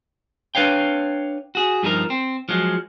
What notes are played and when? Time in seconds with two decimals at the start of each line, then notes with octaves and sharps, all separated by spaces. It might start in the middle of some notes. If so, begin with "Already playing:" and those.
0.55 D4 B4 C#5 F5 G5
1.55 F#4 G#4
1.83 G2 F3 D#4 A#4
2.10 C4
2.49 F3 F#3 G#3